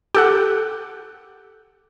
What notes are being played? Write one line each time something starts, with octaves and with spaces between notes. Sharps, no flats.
G4 A4 F#5